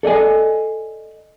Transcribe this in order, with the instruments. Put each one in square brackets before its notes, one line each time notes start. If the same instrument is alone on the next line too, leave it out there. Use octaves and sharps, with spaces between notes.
[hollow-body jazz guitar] A4 D5 D#5 G#5